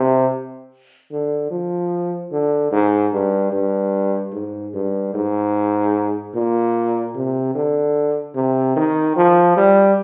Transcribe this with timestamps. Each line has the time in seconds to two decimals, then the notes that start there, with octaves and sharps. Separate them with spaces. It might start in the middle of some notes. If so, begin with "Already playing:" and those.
Already playing: C3
1.11 D3
1.51 F3
2.32 D3
2.72 G#2
3.13 G2
3.52 G2
4.33 G#2
4.74 G2
5.14 G#2
6.35 A#2
7.15 C3
7.55 D3
8.35 C3
8.76 D#3
9.16 F3
9.57 G3